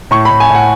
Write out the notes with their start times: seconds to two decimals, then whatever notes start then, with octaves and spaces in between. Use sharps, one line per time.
0.11 A2 C#6
0.25 A2 B5
0.40 G#5
0.49 A2
0.55 F#5